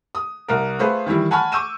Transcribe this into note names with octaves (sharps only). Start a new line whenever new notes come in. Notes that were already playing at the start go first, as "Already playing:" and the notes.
D#6
C2 A#4
A3 F4 G#4 B4 C5
D#3 E3 G3 E4
F#5 G#5 A5 B5 C#6 F6
C#6 D6 E6 G6 D#7 E7